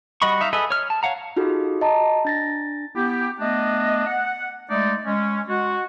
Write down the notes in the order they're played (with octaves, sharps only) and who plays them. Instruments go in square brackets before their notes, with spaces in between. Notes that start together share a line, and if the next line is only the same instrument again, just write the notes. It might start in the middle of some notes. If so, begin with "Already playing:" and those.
[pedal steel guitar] G3 F#4 D#5 B5 C#6
D#4 E5 F5
G#4 A4 B4 D#5 E5
C#5 F6
A5
C#5 F5 F#5 A#5
[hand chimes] D#4 F4 F#4 G#4 A4
D#5 A5 A#5
D4 A6 A#6
[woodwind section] B3 E4 G4
A3 B3 D4 D#5
F#5
G#3 A3 D#4 D5
G#3 C#4
G#3 F#4